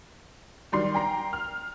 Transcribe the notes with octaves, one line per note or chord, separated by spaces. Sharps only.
D#3 F#3 G3 C6 C7
G5 A#5 C7
F6